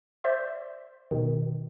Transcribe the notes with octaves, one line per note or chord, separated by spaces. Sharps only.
C5 D5 E5 C6
B2 D#3